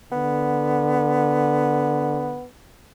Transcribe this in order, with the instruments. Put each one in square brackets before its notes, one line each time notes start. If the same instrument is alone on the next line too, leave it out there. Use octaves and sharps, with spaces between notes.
[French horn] D3 [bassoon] B3